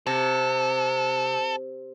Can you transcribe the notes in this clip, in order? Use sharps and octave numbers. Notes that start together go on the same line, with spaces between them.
C3 A4